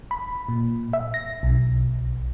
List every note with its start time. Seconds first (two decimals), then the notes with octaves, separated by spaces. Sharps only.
0.11 B5
0.49 A#2
0.93 E5
1.14 A#6
1.43 B1